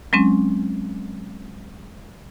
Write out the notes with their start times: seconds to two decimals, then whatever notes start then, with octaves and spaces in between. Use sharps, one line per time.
0.13 F#3 G#3 C4 C#4